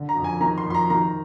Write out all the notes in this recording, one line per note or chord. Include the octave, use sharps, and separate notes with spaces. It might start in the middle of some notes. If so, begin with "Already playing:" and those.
Already playing: D3
A#5
F2
G#5
D#3 A#5
C6
F2
C6
A#5
D#3 A#5